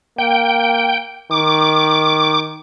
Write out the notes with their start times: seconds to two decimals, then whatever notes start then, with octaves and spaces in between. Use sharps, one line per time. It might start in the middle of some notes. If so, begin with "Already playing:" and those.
0.19 A#3 G5
1.31 D#3 D6